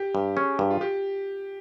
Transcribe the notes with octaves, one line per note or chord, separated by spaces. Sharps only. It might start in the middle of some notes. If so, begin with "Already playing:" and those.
Already playing: G4
G2
C#4 G#4
G2
F4
G4